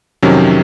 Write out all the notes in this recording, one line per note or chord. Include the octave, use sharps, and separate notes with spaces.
F2 C3 D#3 F#3 C#4